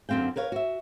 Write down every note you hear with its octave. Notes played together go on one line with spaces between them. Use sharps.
F#2 D3 C4 F5 G5
A#4 B4 C#5 F5
F#4 E5